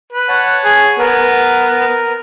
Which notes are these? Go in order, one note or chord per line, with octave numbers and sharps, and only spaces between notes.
B4
C#5 F#5 A5
G#4
B3 A#4